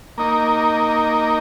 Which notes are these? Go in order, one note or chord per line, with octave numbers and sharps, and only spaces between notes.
A#3 D#4 A#4